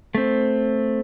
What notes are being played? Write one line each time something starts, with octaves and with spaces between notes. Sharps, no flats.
A3 C4